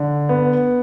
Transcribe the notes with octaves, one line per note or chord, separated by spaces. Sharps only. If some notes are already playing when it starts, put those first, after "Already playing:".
Already playing: D3
B3